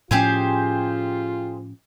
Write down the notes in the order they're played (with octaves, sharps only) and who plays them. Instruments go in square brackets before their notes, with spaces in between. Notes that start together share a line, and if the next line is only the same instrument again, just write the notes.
[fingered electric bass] A2 F3 C#4 [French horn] F4 [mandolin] G4 G#4 C5